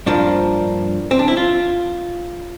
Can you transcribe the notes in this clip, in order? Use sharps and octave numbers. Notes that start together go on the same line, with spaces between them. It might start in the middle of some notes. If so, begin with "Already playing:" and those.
G2 F3 A#3 D4
C4
D4
E4
F4